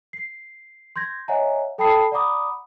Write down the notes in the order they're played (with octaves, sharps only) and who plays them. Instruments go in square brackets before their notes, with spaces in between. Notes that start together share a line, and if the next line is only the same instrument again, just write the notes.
[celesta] C7
C6 G6 G#6 A#6
C#5 D#5 E5 F#5 G#5 A#5
A4 G5 A5 B5 D#6 C7
D5 F#5 A#5 B5 D6 D#6